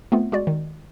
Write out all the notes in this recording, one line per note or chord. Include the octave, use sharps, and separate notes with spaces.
A3 B3 C4 F4
G#3 F#4 D5
D#3